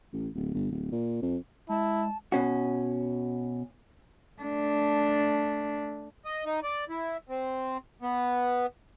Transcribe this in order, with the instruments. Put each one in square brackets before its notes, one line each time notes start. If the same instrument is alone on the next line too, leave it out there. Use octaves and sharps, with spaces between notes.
[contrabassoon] A1
D1
G1
D1
A#2
F2
[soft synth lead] G#3 [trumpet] E4 [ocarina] A5
[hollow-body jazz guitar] B2 C#4 F#4
[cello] A3 D4
[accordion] D#5
D#4
D5
E4
C4
B3